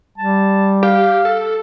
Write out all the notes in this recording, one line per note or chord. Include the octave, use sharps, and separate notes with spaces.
G3 A5
G4 F5
A4